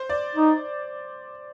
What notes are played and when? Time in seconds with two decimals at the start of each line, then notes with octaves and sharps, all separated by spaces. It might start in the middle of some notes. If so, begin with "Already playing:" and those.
Already playing: C5
0.10 D5
0.36 D#4